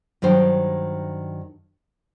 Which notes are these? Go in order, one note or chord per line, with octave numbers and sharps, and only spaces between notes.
G2 D#3 F#3 C5 G5